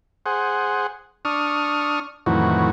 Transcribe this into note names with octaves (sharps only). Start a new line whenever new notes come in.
G#4 C5 F#5
D4 C#6 D#6 F6
F2 A2 D#3 E3 F#3 F#4